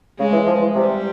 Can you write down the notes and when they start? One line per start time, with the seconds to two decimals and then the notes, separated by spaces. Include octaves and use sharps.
0.19 C#3 G#3
0.32 E3
0.47 F3
0.60 E3
0.75 C3 G3